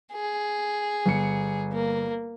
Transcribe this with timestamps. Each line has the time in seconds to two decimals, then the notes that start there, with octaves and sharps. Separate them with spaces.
0.13 G#4
1.06 G1 C#7
1.72 A#3